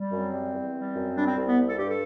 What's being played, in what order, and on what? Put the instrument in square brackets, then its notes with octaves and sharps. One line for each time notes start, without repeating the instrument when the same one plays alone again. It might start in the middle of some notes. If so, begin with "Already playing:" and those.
Already playing: [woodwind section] G3
F#2 C4
G3
E2
G3
F#2
G3 D4
C4
C2
B3
G3
A4
G2 G4
A4